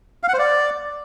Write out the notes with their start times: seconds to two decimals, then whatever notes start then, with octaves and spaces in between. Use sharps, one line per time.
0.23 F5
0.28 F#5
0.34 C5
0.39 D5